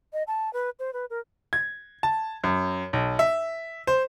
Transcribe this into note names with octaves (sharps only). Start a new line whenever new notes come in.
D#5
A5
B4
C5
B4
A#4
G#6
A5
F#2
B1
E5
C5